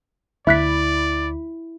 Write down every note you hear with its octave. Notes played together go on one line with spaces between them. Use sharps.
D2 E4 D5 E5 B5 F#6 B6